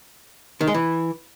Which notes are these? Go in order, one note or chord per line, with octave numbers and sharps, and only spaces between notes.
D#3
G#3
E3